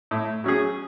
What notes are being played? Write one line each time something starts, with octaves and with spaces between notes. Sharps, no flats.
A2
F#3 C#4 G#4